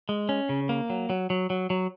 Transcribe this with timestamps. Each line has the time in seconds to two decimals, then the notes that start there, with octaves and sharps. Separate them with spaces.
0.09 G#3
0.29 C#4
0.49 C#3
0.69 A#3
0.90 F#3
1.10 F#3
1.30 F#3
1.50 F#3
1.70 F#3